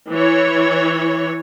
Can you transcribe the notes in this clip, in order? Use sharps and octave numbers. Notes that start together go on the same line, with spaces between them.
E3 C#5